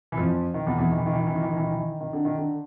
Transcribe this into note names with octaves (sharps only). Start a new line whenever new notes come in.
E3
F2 F3
D#3
E2 E3
E2 E3
D#3
E3
D#3
E3
D#3
E3
D#3
E3
D#3
E3
D#3
E3
D#3
D#3
D3
D#3
D3